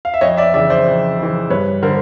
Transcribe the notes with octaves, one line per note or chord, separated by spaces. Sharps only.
F5
E5
F2 C#5 D#5
D5 E5
C#3 E3 D5 E5
C5 D5
F2
C#3 E3
G2 B4 C#5
D3 A#4 C5